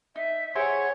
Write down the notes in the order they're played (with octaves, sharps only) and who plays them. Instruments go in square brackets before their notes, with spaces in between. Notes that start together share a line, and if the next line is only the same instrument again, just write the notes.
[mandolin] D#4 [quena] E5
[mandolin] E4 G#4 C5 [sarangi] C#5 [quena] F#5